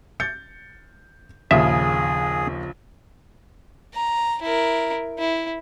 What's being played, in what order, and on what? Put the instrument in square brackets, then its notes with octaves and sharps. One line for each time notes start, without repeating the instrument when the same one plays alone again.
[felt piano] G6 A6 C#7
[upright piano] A#1 C#3 D#6 [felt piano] D#2 [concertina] G#4 [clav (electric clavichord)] E5
[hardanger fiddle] A#5
E4 A#4
E4